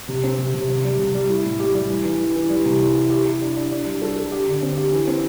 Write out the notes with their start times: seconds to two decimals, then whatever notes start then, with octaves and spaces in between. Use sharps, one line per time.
0.08 C3
0.23 C4
0.38 C3
0.54 C3
0.69 C3
0.84 G3
0.99 C3
1.14 G3
1.29 E4
1.44 A2
1.60 G4
1.74 G3
1.89 E3
2.04 E3
2.19 E3
2.35 E3
2.50 G3
2.66 C3
2.81 E4
2.95 E4
3.10 G4
3.26 G4
3.42 D4
3.56 D4
3.72 D4
3.86 G3
4.02 A4
4.16 A4
4.32 G4
4.47 D3
4.62 C4
4.78 G4
4.92 E3
5.07 C4